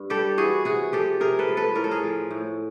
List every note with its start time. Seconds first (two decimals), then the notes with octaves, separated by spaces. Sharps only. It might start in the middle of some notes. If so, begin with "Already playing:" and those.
Already playing: G2
0.10 G3 G4 A4
0.38 E3 F#4 G#4
0.65 C3 F#4 G#4
0.92 F3 G4 A4
1.20 C3 G#4 A#4
1.39 A4 B4
1.48 F3
1.57 A4 B4
1.75 A2 A#4
1.84 A4
1.91 G#4 A#4
2.03 F3
2.31 A2